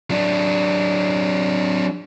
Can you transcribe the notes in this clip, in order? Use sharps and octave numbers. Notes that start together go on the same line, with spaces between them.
F#3 D4